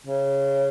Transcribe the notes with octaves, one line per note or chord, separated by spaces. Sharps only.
C#3